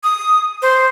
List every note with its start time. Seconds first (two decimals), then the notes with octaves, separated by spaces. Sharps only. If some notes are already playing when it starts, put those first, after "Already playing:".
0.03 D#6
0.62 C5